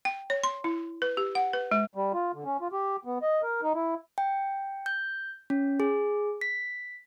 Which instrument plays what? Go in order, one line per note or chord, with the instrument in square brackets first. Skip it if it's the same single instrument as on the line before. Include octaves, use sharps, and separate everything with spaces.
[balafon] G5
C#5
C6
E4
B4
G4
F#5
B4
G#3
[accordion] G3
F4
D3
C#4
F4
G4
B3
D#5
A#4
D#4
E4
[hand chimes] G5
G6
C#4
G#4
B6